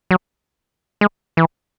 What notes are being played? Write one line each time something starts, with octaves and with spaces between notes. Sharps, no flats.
F#3
G#3
E3